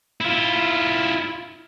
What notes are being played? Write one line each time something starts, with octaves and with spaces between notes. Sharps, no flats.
E4 F4